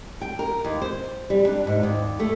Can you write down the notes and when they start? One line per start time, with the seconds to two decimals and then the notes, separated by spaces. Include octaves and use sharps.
0.22 G5
0.39 A#4
0.64 D#2
0.82 C5
1.30 G3
1.47 D4
1.67 G#2
1.83 D#2
2.19 A3